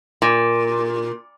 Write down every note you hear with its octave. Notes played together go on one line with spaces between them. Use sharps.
A#2